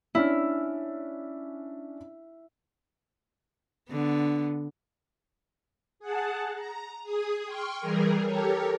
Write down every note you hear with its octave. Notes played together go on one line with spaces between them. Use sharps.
C#4 D4 E4 F6
D3 B3
G#4 F#5 A5
A#5
G#4 D#6
G5 C6 C#6 F6
E3 G3 G#4 A#4
G4 A4 A#4 C#5